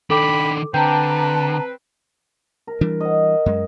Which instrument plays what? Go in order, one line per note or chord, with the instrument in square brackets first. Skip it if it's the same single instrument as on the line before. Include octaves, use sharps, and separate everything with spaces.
[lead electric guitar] D#3 D4 [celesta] A4 D6 [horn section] G5 B5
[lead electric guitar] D3 [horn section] C4 B4 [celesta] G5 G6 [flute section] A5 A#5
[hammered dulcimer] A#4
[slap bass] E3 G3 D4
[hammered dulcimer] D#5 F#5
[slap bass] F#2 G#3